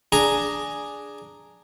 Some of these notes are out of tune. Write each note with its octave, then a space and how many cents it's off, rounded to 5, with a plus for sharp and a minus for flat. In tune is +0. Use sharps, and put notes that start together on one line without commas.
D4 +0 G#4 +0 A#5 +0